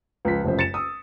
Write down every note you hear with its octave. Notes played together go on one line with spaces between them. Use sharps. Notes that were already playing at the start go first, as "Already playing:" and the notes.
C#2 F3 B6
F1 C#2 F#2 C5
A6 C#7 E7
D#6 E6